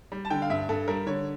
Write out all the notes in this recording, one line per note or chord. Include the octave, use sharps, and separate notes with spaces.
G3
A5
D3 G5
F5
G2 E5
G2 A4
G3 A#4
D3 C#5